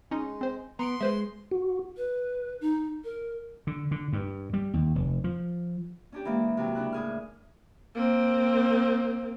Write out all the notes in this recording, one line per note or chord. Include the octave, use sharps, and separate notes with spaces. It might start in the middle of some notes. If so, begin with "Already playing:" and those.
G#3 C#4 D#4
C4 C5
B3 A#5 C6 C#7 D7
G#3 B4 C5 E5
F#4
B4
D#4
A#4
D3
D3
G2
G3
D#2
F1
F3
C#4 D4 G4
E3 G#3 A#3 D4
C3 F#3
C#3 D4 E4 F#6
A2 G#4 F6
A#3 C4